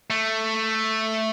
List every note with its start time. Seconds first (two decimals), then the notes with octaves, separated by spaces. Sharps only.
0.10 A3